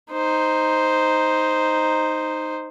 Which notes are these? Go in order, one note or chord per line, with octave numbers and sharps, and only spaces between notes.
D#4 C5